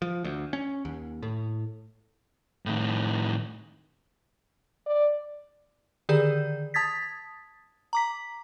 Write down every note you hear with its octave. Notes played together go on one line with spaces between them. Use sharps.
F3
D2
C#4
D#2
A2
A2 D#3
D5
D3 D#3 G4 G#4 D5 G6
A5 D#6 G#6 A6 B6
A#5 D6 B6